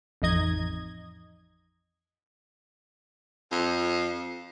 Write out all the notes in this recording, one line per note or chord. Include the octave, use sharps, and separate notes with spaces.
A1 F2 D#4 D#5 G#6
F2